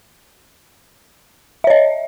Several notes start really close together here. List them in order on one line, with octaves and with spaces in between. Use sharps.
E5 C#5 D#5